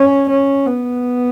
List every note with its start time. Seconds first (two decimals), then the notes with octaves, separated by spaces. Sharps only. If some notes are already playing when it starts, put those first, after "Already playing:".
Already playing: C#4
0.30 C#4
0.67 B3